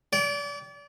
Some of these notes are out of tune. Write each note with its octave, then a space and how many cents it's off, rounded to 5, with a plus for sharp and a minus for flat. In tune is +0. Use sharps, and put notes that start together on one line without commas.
D5 -35 G5 -10